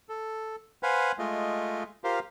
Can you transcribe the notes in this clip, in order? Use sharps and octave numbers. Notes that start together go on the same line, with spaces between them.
A4
B4 C5 F5 F#5 G#5 B5
G#3 A3 F4 D#5
F4 G4 A#4 C5 F5